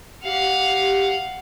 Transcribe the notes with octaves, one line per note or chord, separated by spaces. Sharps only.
G4 F5 F#5